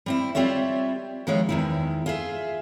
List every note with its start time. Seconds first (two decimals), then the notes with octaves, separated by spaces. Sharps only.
0.06 G3 C4 E4
0.35 G3 C4 F4 C#5 E5
1.27 D#3 F3 G#3 C4 E4 C#5
1.49 E2 D#3 E4
2.06 F4 G#4 E5